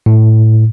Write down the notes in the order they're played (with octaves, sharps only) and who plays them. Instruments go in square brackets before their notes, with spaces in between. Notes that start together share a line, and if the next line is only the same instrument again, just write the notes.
[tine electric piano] A2